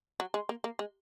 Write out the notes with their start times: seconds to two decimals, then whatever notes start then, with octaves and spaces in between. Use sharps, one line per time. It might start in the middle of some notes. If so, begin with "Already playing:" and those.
0.20 F#3
0.34 G#3
0.49 A#3
0.64 A#3
0.79 G#3